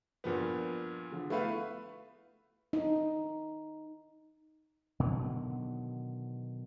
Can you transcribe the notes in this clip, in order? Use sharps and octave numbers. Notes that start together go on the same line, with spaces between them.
G2 A#2 F3 B3
D3 F3
A3 B3 E4 B4 F5
D#4
B2 D3 D#3 F#3